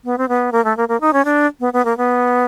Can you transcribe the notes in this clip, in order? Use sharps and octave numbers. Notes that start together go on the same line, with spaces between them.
B3
C4
B3
A#3
A3
A#3
A#3
D#4
C#4
D4
B3
B3
A#3
B3